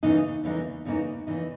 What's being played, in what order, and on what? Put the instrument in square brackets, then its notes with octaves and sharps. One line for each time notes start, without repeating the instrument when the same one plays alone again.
[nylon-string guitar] E2 C#3 E3 A#3 D#4
E2 C#3 E3 A#3 D#4
E2 C#3 E3 A#3 D#4
E2 C#3 E3 A#3 D#4